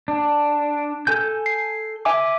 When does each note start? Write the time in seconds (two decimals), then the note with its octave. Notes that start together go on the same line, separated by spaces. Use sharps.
0.08 D4
1.07 A4 G#5 G6
1.46 C7
2.05 E5 G#5 D6